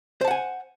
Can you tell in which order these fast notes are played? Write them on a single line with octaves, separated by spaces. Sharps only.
C5 A5 F#5 G#5